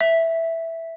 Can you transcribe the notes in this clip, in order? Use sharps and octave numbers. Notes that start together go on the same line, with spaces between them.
E5